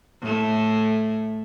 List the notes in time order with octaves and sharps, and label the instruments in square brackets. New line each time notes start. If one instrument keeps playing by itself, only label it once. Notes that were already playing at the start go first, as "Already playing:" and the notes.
[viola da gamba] A2 A3